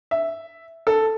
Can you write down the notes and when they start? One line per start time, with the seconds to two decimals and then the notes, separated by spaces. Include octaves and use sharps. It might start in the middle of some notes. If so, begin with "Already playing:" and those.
0.11 E5
0.87 A4